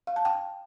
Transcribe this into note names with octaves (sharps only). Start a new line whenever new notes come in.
F5
A5
G5